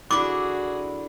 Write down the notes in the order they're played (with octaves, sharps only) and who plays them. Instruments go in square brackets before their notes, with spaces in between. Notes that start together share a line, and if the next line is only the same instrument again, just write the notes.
[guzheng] D3 E4 [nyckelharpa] F#4 G#4 [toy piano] D6